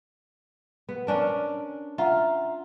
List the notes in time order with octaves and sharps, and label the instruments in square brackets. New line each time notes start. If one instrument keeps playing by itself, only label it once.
[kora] B3
C#4 D4 A#4
[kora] F4 [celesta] E5 F#5 A#5